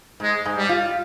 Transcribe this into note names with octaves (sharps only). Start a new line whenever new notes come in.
G#2 G#3
G#2
G3
F4